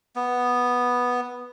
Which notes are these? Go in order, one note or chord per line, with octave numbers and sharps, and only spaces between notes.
B3